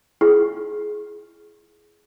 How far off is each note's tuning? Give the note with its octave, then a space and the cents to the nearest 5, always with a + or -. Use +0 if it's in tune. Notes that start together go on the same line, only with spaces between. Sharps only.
E4 +35 G#4 +15